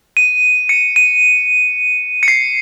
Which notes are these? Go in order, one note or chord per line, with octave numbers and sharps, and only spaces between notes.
D#7
C#7
D#7
C#7
C7